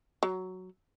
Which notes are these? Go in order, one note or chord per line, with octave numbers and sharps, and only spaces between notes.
F#3